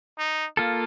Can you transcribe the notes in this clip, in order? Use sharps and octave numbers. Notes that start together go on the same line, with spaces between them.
D#4
A#3 F4 A4